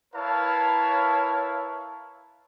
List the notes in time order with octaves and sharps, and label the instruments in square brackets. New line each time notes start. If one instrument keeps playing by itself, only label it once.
[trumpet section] E4 A#4 B4 C#5 F5 A5